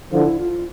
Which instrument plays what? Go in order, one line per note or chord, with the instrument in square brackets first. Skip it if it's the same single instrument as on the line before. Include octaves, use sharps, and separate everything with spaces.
[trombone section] D3 F3 [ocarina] E4
[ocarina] F4